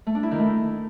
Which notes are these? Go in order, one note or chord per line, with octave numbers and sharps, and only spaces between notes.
A3
D4
E4
D#3
A3